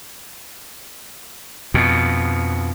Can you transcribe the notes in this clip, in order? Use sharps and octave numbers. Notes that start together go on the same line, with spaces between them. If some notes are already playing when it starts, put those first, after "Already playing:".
F2 B2